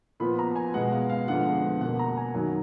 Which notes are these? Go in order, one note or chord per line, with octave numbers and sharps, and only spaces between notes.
A#2 F3 B3 B5
A#5
G#5
B2 G#3 B3 F#5
F5
F5
F2 D3 G#3 B3 F#5
B2 A#3 F#5
A#5
G#5
F#2 D#3 F#3 F#5